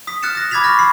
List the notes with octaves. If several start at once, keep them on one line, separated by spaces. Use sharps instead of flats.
D#6 B6
D#6 F6 F#6 A6 C#7 E7
D#6 A#6
B5 D6 G#6 A6 B6 F7
C#6 F6 A#6
B5 C7